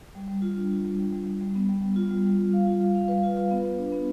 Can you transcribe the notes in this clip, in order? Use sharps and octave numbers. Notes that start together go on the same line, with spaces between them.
G3
G3
F4
D4
F4
G3
G3
G3
G3
G3
B3
G3
G3
F4
G3
G3
F4
F5
F4
F4
F5
B4
F4
B4
B3
B3
D4
B3